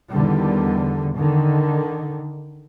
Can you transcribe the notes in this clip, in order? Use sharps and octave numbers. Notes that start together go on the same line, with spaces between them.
E2 D3 D#3 G3
D3 D#3